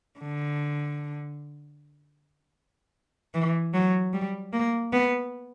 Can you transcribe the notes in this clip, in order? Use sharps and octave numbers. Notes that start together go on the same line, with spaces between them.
D3
E3
F#3
G3
A#3
B3